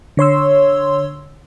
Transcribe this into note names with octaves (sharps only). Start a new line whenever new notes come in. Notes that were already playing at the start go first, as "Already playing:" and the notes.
D3 C#5 C6 E6